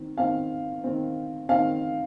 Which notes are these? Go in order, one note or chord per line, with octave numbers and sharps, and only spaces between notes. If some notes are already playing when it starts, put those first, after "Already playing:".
Already playing: D#3 C4
D#3 C4 F5
D#3 C4
D#3 C4 F5